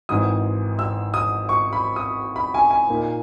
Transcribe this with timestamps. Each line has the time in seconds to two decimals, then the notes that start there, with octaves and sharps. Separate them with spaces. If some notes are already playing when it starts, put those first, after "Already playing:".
0.09 G#1 G#2 E3 D#6
0.79 E6
1.14 D#6
1.49 C#6
1.73 B5
1.96 D#6
2.36 B5
2.54 G#5
2.71 G#5
2.89 A#2 A#3 D#4